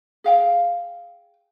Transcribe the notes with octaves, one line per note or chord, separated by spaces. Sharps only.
G#4 F5 G5